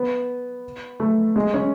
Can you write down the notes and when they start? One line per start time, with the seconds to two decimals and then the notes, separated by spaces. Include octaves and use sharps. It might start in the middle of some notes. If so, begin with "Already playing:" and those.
Already playing: B3
1.00 A3
1.36 G#3
1.54 C#4